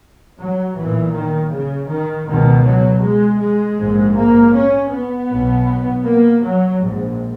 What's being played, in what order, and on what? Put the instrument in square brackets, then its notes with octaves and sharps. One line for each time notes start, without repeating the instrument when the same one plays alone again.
[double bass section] F#3
B1 A#2 E3
D#3
C#3
D#3
C#2 B2 D#3
F#3
G#3
G#3
A#1 G#2
A#3
C#4
B3
B1 B2
A#3
F#3
A#1 G#2